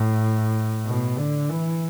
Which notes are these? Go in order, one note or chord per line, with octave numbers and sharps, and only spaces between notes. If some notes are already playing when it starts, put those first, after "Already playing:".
Already playing: A2
B2
D3
E3